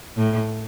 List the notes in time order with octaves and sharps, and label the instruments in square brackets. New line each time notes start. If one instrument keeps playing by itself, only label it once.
[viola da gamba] A2